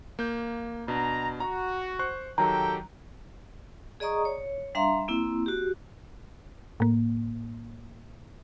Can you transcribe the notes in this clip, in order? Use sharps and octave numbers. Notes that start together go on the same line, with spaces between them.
A#3 G6
B2 D4 A#5
F#4 A#5
C5 C#6 F#6
D#3 F#3 G4 A4 G5 A#5
G#4 D5 D#5 A#5 C#6 D#6
C#5
G3 D4 E5 F5 A#5 C6
A#3 C4 E4
F#4 G4
A2 A#3